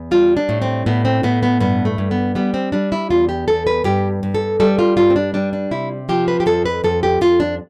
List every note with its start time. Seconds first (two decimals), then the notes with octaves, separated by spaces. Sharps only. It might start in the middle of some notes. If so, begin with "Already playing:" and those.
Already playing: E2
0.11 G3 F4
0.37 D4
0.49 A2
0.62 C4
0.86 A2 B3
1.05 C4
1.23 A2 B3
1.43 B3
1.60 G2 B3
1.85 A3
1.98 G2
2.11 B3
2.35 G3 B3
2.54 C4
2.72 G3 D4
2.92 E4
3.10 E2 F4
3.29 G4
3.48 E2 A4
3.67 B4
3.84 G2 G4
4.23 G2
4.35 A4
4.60 G3 A4
4.79 F4
4.97 G2 F4
5.10 C4
5.16 D4
5.34 G3 D4
5.53 D4
5.71 C3 E4
6.09 F3 G4
6.28 B4
6.40 G4
6.46 F2 A4
6.66 B4
6.84 F2 A4
7.03 G4
7.21 F2 F4
7.40 D4